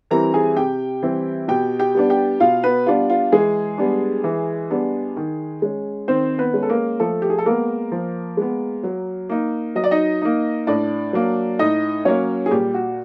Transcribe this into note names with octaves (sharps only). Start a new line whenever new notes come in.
E3 G3 C4 E4 A#4 A#5
G#4 G#5
C3 G4 G5
E3 G3 C4 E4
B2 G4 G5
G4 G5
G3 B3 D4
G4 G5
B2 F4 F5
B3 B4
G3 B3 D4 F4
F4
E3 G#3 G#4
G3 B3 D4
E3
G3 B3 D4
D#3
G#3 C#4
D#3 C4 C5
B3 B4
G#3 C#4
A4
A#3 A#4
F3 A3 A4
G4
G#4
A4
G#3 A#3 B3 A#4
F3
G#3 B3
F#3
A#3 D#4
F#3 D#5
D5
D#4 D#5
A#3 D#4
A2 D4 D5
F#3 A#3
A2 D#4 D#5
F#3 A#3 C#4 C#5
G#4
A#2 G3 G4
F#4